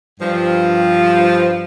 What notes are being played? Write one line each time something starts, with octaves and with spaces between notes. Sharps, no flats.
G2 F3